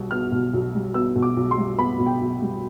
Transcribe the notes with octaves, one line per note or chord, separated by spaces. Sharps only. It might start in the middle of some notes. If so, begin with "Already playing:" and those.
Already playing: B1 B2 G3
B3 F6
B2
B1
G3
B3 E6
B2
D6
B1
C6
G3
B3 B5
B2
G5
B1
G3